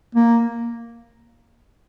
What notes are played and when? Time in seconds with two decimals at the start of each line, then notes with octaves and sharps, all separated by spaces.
0.15 A#3